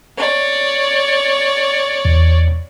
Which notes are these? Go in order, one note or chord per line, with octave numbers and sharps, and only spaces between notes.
C#5 D5
E2